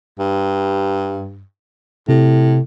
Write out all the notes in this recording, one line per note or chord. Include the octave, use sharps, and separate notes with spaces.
G2
A2 C3